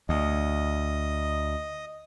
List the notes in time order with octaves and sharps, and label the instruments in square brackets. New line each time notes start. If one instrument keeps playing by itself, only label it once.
[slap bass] D2 [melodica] D#5